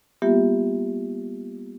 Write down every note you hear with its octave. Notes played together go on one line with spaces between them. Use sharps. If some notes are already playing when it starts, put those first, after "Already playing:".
G3 A#3 B3 F4 G4 E5